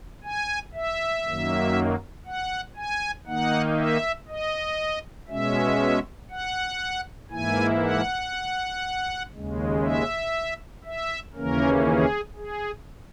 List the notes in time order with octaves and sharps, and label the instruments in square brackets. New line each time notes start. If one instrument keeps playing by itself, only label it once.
[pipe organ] G#5
E5
F#2 D#3 F#3 A#3
F#5
G#5
D#3 A#3 D#4 F#5
E5
D#5
B2 G#3 C#4 E5
F#5
G#2 E3 A#3 E4 G#5
F#5
D#2 C#3 G#3
E5
E5
D#2 C#3 E3 A#3 C#4 A#4
G#4
G#4